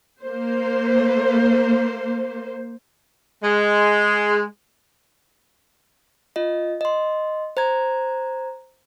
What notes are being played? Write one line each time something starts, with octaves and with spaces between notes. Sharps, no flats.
A#3 C5
G#3
F4 D#5
D#5 C6
C5 A#5 G#6